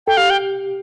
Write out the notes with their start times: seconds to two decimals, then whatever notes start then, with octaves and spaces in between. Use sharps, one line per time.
0.07 A4 G5
0.17 G4 F5
0.30 G5